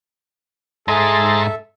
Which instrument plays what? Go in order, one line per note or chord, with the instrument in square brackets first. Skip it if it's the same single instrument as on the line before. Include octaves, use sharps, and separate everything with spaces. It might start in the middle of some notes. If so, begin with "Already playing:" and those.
[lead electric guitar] G#2 D#5 [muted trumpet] G#4 [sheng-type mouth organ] A4 E5 [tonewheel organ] A#5 C6 A6